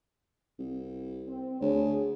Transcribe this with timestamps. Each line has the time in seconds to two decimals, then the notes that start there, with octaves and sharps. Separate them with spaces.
0.59 C2
1.28 C4
1.61 D2 G#4 C#5